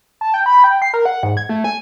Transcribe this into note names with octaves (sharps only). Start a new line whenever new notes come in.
A5
G5
B5
G5
C7
A#4
F#5
G#2
G#6
A3
G#5